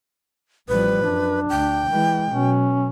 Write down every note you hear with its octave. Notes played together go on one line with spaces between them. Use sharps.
A1 F3 G3 B4
F#2 D4
D2 G5
E3 G#3
B2 F#3 C#4